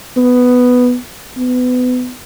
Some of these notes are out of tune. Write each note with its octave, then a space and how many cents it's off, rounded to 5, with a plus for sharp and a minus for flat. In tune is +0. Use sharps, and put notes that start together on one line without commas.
B3 +5
B3 +25